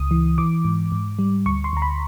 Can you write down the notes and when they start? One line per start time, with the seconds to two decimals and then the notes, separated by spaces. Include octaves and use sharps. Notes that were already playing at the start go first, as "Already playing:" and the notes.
Already playing: C#2 D#6
0.11 E3
0.38 E3 D6
0.65 G#2
0.92 G#2
1.19 G3
1.46 D2 C#6
1.64 C6
1.73 D2 A#5
1.82 B5